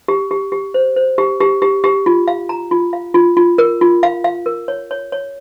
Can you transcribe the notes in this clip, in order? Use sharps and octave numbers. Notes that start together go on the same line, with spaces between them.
G4
G4
G4
C5
C5
G4
G4
G4
G4
F4
F5
A#5
F4
F5
F4
F4
A#4
F4
F5
F5
A#4
C#5
C#5
C#5